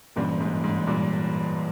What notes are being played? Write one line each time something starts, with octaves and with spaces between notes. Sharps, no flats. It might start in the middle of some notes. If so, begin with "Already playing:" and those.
G2 A#2 E3 A#3 C#4
G#2
G#2
G2 A#2